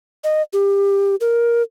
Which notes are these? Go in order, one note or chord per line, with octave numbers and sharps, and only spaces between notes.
D#5
G4
A#4